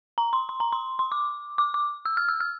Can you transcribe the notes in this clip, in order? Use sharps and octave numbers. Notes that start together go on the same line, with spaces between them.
A#5
C6
C6
A#5
C6
C6
D6
D6
D6
E6
F6
E6
F6